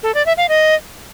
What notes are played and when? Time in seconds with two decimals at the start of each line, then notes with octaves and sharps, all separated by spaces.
0.03 A4
0.14 D5
0.26 E5
0.37 F5
0.49 D#5